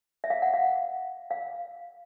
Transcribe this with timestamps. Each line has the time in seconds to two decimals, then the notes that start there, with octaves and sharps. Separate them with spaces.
0.24 E5
0.30 F5
0.42 F#5
0.54 F5
1.31 F5